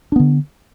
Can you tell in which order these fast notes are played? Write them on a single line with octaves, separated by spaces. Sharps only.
D4 B3 D3